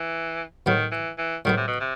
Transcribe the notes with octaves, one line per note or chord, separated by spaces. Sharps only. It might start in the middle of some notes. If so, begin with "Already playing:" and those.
Already playing: E3
A2 D#3 F#3 B3
E3
E3
A2 D#3 F#3 B3
C3
B2
C3